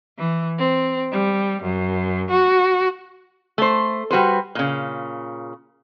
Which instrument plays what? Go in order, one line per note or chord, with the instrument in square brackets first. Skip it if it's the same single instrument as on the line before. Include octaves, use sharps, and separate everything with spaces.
[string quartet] E3
C4
G3
F#2
F#4
[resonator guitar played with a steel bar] A3 C5
G3 F#4 B4 C5
A#2 C#3